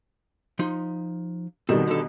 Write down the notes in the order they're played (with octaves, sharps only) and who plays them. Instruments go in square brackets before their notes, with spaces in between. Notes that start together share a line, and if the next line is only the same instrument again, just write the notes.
[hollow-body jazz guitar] F3 D#4 C6
[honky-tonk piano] B2 D#3 G3 [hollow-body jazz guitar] C4 A4
[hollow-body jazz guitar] D3 A4